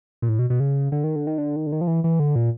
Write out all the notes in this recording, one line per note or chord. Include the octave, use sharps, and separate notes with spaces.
A#2
A2
B2
B2
C#3
D3
D#3
D3
D#3
D3
D#3
D3
D#3
F3
E3
E3
D3
A#2